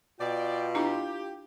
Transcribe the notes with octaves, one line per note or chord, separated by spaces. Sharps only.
B2 F4 D5 G5
D4 E4 G4 A#5